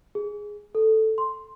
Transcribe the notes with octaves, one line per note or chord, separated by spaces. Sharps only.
G#4
A4
C6